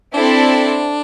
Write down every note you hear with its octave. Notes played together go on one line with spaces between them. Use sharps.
C4 D4 E4 A4 D5